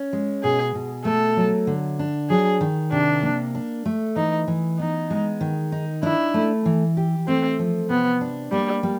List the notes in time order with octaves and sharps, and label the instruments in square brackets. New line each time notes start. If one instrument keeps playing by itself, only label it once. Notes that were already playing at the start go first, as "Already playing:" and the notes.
Already playing: [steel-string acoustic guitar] C#4
G#3
[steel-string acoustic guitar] B2 [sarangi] G#4
[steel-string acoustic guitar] B2
[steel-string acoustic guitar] A3 [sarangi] A4
[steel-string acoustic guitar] F#3
D3
D4
[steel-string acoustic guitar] F#3 [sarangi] G#4
[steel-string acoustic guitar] D#3
[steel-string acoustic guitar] C3 [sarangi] D4
[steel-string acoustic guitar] A#3
D4
A3
[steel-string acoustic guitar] E3 [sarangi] D#4
[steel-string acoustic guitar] E3
[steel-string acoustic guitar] B3 [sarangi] D#4
[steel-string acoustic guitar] G#3
D#3
D#4
[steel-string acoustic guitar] D4 [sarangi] E4
[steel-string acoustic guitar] A3
E3
G4
[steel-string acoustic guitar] A3 [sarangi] C4
[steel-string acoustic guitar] F3
[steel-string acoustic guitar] C3 [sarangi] B3
[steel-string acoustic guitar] D4
[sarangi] G3 [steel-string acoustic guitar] A#3
[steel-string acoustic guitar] G3